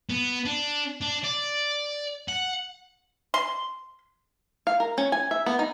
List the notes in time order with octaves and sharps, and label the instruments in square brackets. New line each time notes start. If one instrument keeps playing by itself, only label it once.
[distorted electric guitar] B3
D4
D4
D5
F#5
[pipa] C6
[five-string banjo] F5
A#4
C#4
G#5
E5
B3
D#4